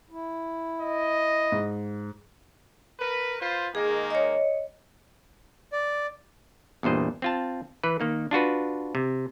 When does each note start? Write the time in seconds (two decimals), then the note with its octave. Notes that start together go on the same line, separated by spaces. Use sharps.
0.10 E4
0.81 D#5
1.52 G#2
3.00 A#4 B4
3.41 F4 B4 C5
3.75 D#3 G#3 A#3 G#4
4.10 C#5 D#5
5.72 D5
6.83 E2 G2 A#2 C5 D#5
7.22 C4 F4 A5
7.83 E3 B4
8.00 D#3 A#3 D#4
8.31 D4 F4 F#4 B4
8.95 C3